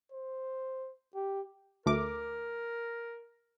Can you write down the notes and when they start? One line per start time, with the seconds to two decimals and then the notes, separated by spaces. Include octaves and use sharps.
0.12 C5
1.15 G4
1.86 D2 A3 A#4 D6